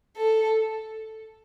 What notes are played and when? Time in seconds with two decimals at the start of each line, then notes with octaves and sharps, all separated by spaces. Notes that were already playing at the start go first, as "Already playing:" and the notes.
0.17 A4